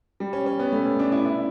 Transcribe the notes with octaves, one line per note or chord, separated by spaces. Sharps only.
G3
C#4
C#4
B3
A3
C#4
D4
E4
E4